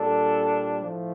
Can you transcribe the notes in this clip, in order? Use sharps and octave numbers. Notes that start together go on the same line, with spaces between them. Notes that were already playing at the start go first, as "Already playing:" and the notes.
Already playing: A#2 G3 D4 A4
A2 F3 A3